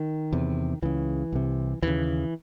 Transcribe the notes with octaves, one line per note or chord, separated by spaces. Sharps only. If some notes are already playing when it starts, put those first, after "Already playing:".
Already playing: D#3
E2 C3
C#2 C#3 E3
C2 C3
D#2 C#3 E3